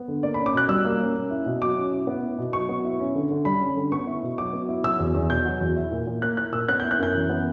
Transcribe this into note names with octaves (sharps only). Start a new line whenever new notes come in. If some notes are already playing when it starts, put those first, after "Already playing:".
Already playing: B3
D3
A#3 D5
B5
C#4
D6
B2 F#6
G3 E6
A#3
C#4
C#4
E4
B2
F#3 D6
C#4
E4
B3
E4
B2
F#3 C#6
B3
E4
C#4
D3
D3
G3 B5
C#4
D3
B3 C#6
E4
B2
F#3 D6
B3
E4
F#3 E6
E2
E2
B2 G6
F#3
E2
E4
A#2
A#2
A#3 F#6
E4 F#6
A#2 E6
B3 F#6
G6
E4
F#6
F#2 G6
E3
B3